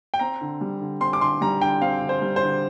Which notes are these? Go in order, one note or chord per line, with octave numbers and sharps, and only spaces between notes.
G5
C4 A#5
D3
G3
D3
C4 C6
D6
D3 C6
G3 A#5
D3 G5
C4 F5
D3
C5
G3
C5
D3